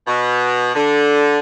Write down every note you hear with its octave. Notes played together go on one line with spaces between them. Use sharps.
B2
D3